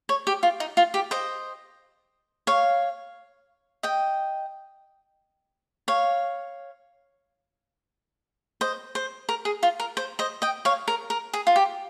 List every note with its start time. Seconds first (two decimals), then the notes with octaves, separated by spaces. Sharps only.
0.09 C#5
0.27 G4
0.43 F4
0.60 D#4
0.77 F4
0.94 G4
1.11 C5 D#5
2.47 C#5 F5
3.83 D#5 G5
5.88 C#5 F5
8.61 C5 D#5
8.95 C5
9.29 A#4
9.45 G#4
9.63 F4
9.80 A#4
9.97 C5
10.19 C5 D#5
10.42 D#5 G5
10.65 C#5 F5
10.88 A#4
11.10 A#4
11.33 G#4
11.47 F4
11.56 G4